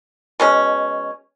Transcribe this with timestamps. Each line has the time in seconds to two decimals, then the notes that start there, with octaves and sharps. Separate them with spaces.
0.40 B2 G#3 C#4